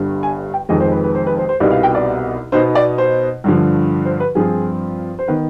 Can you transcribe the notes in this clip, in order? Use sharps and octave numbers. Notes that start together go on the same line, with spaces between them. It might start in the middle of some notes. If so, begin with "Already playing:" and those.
Already playing: G1 G2 D3 G3
G#5
G5
F1 F2 D#3 G#3 D#5
C5
B4
B4
C5
B4
C5
C5
C2 B2 G3 B3 D#4 D5
F5
G5
D5
B2 B3 D#4 C5
D5
C5
G2 D3 F3
C5
B4
G2 F3 C4 F4 G#4
C5
D#3 B3 B4